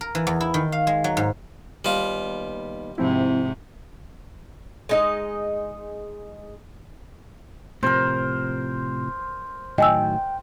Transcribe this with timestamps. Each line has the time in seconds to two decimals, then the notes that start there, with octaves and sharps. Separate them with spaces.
0.01 A#4
0.15 E3
0.27 E2
0.41 E4
0.54 D#3
0.72 F5
0.87 G#3
1.04 F#3
1.17 G#2
1.85 D#2 G3 B3 F4
2.98 G#2 C3 F3 C4 E4
4.89 G#3 D#4 D#5
7.83 A2 C3 F3 A#4 C5
9.78 A2 D#3 F#3 D#5 G5 G#5 E6